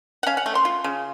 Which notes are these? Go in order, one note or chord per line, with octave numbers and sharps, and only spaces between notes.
F#5
C#4 F5
F#5
A3
C6
F4
C#3